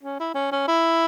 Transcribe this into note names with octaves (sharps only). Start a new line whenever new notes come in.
C#4
E4
C#4
C#4
E4